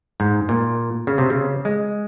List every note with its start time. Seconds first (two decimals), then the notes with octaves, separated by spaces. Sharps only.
0.20 G#2
0.49 A#2
1.07 C#3
1.18 C3
1.30 C#3
1.65 G#3